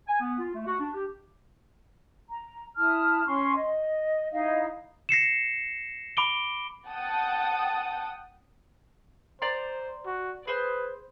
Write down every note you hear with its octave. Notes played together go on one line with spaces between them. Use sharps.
G#5
B3
F4
A3
F#4
D4
G4
A#5
E4 A5 D#6 F6
C#4 C6 C#6
D#5
D#4 E4 D#5 F5
A#6 C7 C#7 E7
B5 D6 D7 G7
F#5 G5 A5 D#6
C5 D5 A#5 C6
F#4
G#4 B4 C5